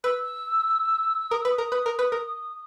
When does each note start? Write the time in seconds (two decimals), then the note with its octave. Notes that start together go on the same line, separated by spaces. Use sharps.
0.04 B4 E6
1.31 A#4 D#6
1.42 B4 E6
1.51 D#6
1.58 A#4
1.72 B4
1.86 A#4
1.99 B4
2.12 A#4